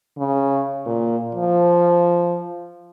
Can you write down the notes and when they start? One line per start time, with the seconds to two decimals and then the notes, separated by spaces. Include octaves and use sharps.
0.17 C#3
0.86 A#2
1.35 F3